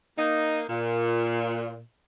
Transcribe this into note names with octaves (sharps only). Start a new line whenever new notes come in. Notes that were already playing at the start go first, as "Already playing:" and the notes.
A#3 D#4
A#2